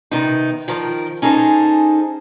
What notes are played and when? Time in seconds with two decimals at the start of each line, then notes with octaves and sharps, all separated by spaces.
0.11 C3 D#3 B3 D#4
0.68 D#3 F3 A#4
1.22 C#4 D#4 G#4 A4 C5